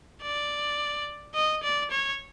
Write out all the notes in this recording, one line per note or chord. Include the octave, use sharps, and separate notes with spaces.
D5
D#5
D5
C#5